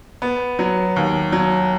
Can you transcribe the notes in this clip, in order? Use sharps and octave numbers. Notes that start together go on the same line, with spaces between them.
B3
F#3
D#2
F#3